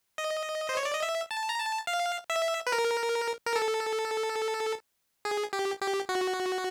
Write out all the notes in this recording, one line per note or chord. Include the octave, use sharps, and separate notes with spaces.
D#5
C5
C#5
D5
D#5
E5
A5
A#5
A5
F5
E5
B4
A#4
A#4
A4
G#4
G4
G4
F#4